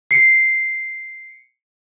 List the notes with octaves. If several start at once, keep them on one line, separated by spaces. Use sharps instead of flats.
C7 C#7